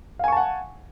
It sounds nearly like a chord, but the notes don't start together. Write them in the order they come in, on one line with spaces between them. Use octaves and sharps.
F5 G#5 C#6 A5 F#5